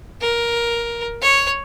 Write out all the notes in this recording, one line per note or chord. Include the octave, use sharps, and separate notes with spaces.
A#4
C#5